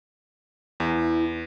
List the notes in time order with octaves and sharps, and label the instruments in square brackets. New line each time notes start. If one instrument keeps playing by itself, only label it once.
[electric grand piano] E2 [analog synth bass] E4